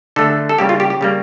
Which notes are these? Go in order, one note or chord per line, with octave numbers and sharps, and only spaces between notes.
D3 A3 A4
A4
C#3 G3 A#3 G4
F4
G4
G4
C#3 G3 A#3